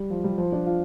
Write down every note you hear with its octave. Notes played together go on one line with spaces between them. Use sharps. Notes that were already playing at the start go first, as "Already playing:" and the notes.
Already playing: G3
F3
G3
F3
D4
F4